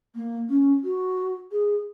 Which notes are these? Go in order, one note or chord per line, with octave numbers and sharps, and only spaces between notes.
A#3
C#4
F#4
G#4